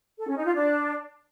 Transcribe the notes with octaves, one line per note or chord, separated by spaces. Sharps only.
A4
C#4
D#4
F4
D4